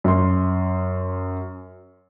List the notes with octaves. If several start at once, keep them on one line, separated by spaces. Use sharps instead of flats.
F#2 C6